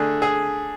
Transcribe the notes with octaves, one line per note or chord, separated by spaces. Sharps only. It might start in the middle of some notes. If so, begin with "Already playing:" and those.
Already playing: D3 A3 D4 G#4
G#4